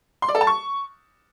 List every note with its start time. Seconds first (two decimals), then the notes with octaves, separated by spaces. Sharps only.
0.22 C6
0.29 D5
0.35 A4
0.41 A5
0.47 C#6